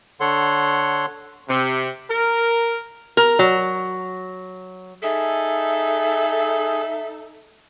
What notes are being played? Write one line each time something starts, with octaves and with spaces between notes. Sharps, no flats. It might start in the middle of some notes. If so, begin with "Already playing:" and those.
D3 A4 C#5 F#5 C6
C3
A#4
A#4
F#3
D#4 G#4 A4 E5